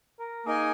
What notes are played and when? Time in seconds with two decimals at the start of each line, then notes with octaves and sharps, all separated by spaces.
0.19 A#4
0.46 A#3 D#4 G#4 A#4 D#5 G#5